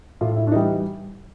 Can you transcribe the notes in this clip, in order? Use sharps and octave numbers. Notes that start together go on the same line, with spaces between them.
A2 F4
E4
D4
E3 G3 D#4